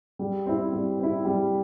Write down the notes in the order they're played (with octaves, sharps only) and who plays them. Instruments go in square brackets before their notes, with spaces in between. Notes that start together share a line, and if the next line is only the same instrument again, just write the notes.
[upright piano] G3
C4 E4
G3
C4 E4
G3